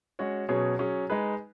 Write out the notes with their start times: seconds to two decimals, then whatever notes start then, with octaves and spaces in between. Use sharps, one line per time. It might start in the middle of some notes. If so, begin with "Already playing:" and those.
0.19 G#3 C#4 F#4 C#5
0.49 B2 F#3 C#4 G#4 C#5
0.79 F#3 C#4 G#4
1.10 G#3 D#4 G#4 B4